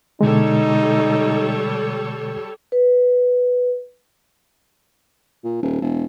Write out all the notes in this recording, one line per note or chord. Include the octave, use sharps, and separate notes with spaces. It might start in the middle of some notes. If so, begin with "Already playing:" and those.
B2 D3 G3 G#3 D#4 A4 C#5
B4
A#2
D#1
E1